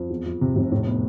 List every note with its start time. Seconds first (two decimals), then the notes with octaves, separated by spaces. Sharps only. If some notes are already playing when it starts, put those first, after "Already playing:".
Already playing: F2
0.10 E2
0.26 F3
0.41 C3
0.56 F1
0.72 A2
0.87 B3